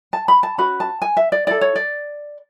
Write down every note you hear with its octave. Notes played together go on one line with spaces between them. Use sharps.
A5
B5
A5
C#4 F#4 B4 B5
A5
G#5
E5
D5
E4 A4 D5
C#5
D5